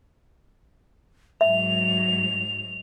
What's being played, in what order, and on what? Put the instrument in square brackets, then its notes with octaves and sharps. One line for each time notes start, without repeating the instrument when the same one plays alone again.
[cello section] G#2 F#3 [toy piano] E5 [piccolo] F7